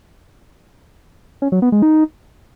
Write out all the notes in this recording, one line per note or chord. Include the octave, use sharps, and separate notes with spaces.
C#4
F#3
B3
G#3
D#4